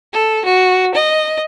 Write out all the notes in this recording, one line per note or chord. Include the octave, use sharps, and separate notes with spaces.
A4
F#4
D#5